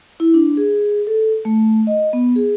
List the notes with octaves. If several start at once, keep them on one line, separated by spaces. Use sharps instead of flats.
E4
D4
G#4
A4
A3
D#5
B3
G#4